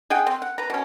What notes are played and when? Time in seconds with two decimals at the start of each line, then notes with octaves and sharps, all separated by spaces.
0.10 G#4 D#5 F#5 G5
0.27 C4
0.42 F#5
0.58 B4 A#5
0.70 B2 C#4